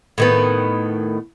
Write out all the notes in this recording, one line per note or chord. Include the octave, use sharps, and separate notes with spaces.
A2 D#3 B3